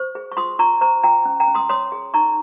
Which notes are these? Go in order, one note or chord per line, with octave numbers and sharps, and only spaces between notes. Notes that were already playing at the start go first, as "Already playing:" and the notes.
Already playing: C5 C#6
G#4
C#6
F4 C6 D#6
F4 A#5 C#6
C5 A#5 C#6
F4 G5 A#5
C#4
G5 A#5
C#4
C6 D#6
C#5 C6 D#6
G#4
D#4 A#5 C#6